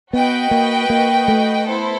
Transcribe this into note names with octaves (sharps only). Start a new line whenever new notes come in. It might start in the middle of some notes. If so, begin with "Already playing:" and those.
B3 F#4 B4 D#5 G5
A#3
A#3
A3
B3 E4 A4 C5